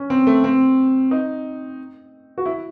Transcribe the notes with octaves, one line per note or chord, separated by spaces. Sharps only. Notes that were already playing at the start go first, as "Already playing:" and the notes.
Already playing: C#4
C4
A3
C4
D#4
F#4
E4